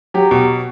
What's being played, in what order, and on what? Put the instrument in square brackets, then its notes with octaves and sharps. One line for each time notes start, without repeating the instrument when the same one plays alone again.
[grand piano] F#3 G4
B2